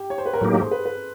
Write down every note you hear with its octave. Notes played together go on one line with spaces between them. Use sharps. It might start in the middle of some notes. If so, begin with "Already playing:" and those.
Already playing: G4
C#5
C5
B4
A#4
A2 F#3 A#3 D#4 G4 A4
G#4
C5
B4
B4